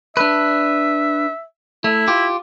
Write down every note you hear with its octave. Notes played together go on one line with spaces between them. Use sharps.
D4 B4 E5
A3 E4
F4 G4